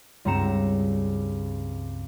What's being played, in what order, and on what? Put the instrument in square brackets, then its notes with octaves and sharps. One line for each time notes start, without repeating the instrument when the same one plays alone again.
[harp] C#2 G2 C4 A#5 C#7 E7